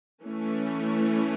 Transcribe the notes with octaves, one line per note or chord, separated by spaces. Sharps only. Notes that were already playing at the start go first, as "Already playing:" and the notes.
E3 A3 C#4